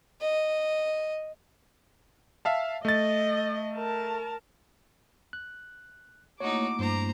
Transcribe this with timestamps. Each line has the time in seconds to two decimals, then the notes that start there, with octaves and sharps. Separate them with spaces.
0.21 D#5
2.45 E5 F5 A5
2.85 A3 D#5 A6
3.76 A#4 A5
5.33 F#6
6.40 A3 A#3 D#4 E4 F#4 C#5 D6
6.79 G2 C5 A#5